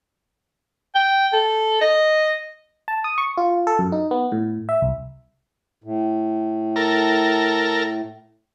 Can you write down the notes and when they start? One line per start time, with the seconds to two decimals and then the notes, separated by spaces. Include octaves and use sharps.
0.95 G5
1.33 A4
1.81 D#5
2.88 A5
3.04 D#6
3.18 C#6
3.38 F4
3.67 A4
3.79 F#2
3.92 D#4
4.11 B3
4.32 A2
4.69 E5
4.82 C2
5.84 A2
6.76 A4 A#4